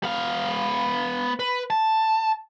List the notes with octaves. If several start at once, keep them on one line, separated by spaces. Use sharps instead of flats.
B3 F5
B4
A5